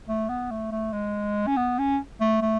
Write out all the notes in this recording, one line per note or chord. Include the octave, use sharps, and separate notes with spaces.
A3
B3
A3
A3
G#3
C#4
B3
C#4
A3
A3